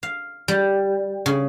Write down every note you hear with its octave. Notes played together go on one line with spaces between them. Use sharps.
F5
G3
C#3